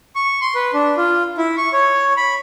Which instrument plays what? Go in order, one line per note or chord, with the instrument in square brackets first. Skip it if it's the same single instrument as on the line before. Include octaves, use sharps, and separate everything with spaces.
[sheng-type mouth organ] C#6
C6
B4
D4
F4
E4
C#6
C#5
B5